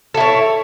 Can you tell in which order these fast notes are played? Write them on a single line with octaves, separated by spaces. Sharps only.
A4 E4 C#5